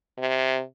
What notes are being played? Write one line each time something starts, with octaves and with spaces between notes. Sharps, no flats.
C3